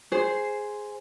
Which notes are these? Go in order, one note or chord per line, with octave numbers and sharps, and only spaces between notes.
G#4 C5